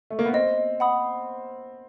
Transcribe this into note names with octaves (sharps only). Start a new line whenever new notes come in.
A3
A#3
B3
C4 D#5
F#5 B5 D#6